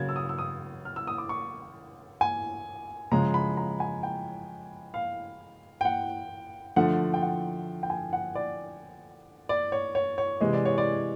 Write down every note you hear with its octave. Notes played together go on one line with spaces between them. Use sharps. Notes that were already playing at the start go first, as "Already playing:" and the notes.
Already playing: C#3 F#3 A#3 G#6 A6
E6
D#6
E6
D#6
F6
E6
D#6
D6
C#6
G#5
C#3 F3 G#3 A#5
B5
A#5
G#5
G5
F5
G5
F#5
D3 F3 A3 F#5
G5
F#5
G5
G#5
F#5
D5
D5
C#5
C#5
C#5
C3 E3 G#3 D#5
D5
C#5
D5